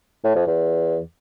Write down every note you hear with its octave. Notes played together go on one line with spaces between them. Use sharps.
A2
F2
E2